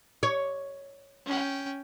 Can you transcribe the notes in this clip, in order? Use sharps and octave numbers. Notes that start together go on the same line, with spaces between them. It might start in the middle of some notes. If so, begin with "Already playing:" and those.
C#5
C#4 G5